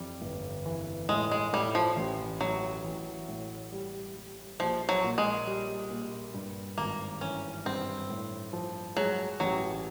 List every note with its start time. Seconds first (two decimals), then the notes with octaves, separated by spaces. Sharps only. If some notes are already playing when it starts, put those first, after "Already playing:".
Already playing: F2 E3 G3
0.22 G1
0.66 E3
1.09 A2 G#3
1.31 G#3
1.53 A2 G3
1.75 F3
1.97 A1
2.40 A1 F#3
2.84 E3
3.28 A2
3.72 G3
4.16 G3
4.60 A#1 F3
4.89 F#3
5.03 A#2
5.18 G#3
5.47 G3
5.91 A#2
6.34 G2
6.78 G#1 A#3
7.21 E3 C#4
7.65 G2 C4
8.09 A2
8.53 F3
8.96 F#3 G#3
9.40 A1 F#3